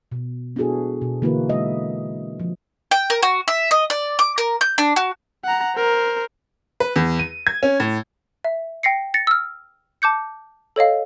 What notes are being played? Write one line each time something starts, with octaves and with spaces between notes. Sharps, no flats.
B2
B3 D4 E4 F#4 G#4 A4
B2
D3 E3 A#3 E4 F#4 B4
G#3 D#5 E5
F3
G5
A#4
F#4
E5
D#5
D5
D6
A#4
G6
D4
F#4
F#5 A#5
A#4 C5
B4
E2
D#7
G#6
C#4
A2
E5
G5 A#6 C7 C#7
A6 A#6 C#7
E6 F6
A5 D6 G6 C#7
A4 C#5 D#5 F5